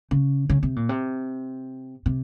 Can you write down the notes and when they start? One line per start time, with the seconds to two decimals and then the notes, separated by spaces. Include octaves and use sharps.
0.11 C#3
0.50 C#3
0.63 C3
0.76 A#2
0.89 C3
2.06 C3